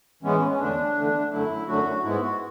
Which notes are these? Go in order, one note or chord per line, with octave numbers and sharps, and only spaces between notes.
A2 E3 G#3 B3 C#4
C#4
E2 D3 A3 D4
E2 D3 A3
F#2 D3 F#3 A3 E4
F#2 D3 F#3 A3 F#4
G#2 G#3 B3 E4
F#4